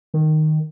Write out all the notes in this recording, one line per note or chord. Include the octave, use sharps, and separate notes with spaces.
D#3